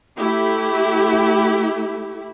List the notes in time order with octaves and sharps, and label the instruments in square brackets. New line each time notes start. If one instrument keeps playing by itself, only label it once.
[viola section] A3 E4 G4